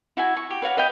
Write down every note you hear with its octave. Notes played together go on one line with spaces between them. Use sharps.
E4 F#4 E5 G#5
C#6
G4
B4 C#5 F5 F#5
B4 D#5 F5 G5